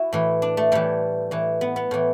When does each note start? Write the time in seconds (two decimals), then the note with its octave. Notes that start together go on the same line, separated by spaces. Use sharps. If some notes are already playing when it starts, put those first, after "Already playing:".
Already playing: E4 F#4
0.13 A2 E3
0.42 D4
0.57 A3
0.72 A2 E3 G3
1.31 A2 E3
1.61 B3
1.76 B3
1.91 A2 E3